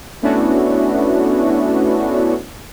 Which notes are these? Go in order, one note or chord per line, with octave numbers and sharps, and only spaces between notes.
A3 B3 C#4 D4 E4 F#4